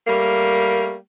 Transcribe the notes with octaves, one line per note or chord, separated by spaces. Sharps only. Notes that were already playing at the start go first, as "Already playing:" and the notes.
G3 A3 A#3 A#4